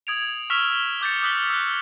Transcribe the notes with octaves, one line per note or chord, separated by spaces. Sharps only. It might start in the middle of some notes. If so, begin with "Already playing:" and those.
D#6 G#6 D7 F7
C#6 E6 F6 B6 F7 G7
D6 G6 A6 C#7
D6 D#6 F#6 B6 G7
E6 F#6